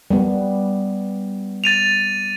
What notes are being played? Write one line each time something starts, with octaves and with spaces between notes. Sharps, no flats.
G3 B3
A6 D#7 F7